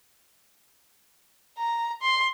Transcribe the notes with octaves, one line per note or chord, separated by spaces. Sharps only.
A#5
C6